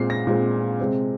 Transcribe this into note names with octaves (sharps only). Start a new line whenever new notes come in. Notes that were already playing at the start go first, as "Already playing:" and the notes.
Already playing: A#2 G#3 C4 C7
A#6
A#2 G#3 C4
C3 G#3 C4